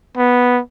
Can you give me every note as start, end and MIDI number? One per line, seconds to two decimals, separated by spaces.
0.17 0.60 59